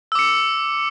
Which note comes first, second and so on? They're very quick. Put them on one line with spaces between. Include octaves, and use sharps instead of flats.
E6 D6 C#7